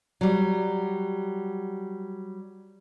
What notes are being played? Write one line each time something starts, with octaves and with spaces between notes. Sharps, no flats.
F#3 G3